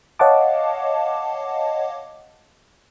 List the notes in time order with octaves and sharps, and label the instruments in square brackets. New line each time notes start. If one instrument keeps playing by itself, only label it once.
[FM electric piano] C#5 D#5 F5 F#5 A5 D6